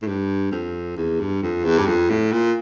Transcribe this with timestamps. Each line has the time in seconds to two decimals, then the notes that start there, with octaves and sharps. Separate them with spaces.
0.02 A2
0.07 G2
0.51 F2
0.96 E2
1.20 G2
1.42 F2
1.64 E2
1.78 G2
1.86 F2
2.10 A2
2.32 A#2